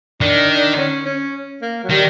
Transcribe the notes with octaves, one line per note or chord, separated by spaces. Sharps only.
D#3 D4
D4
C#4
C#4
A#3
F#3
D#3 G3